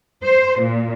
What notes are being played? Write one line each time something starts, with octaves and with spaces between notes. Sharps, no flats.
C5
A#2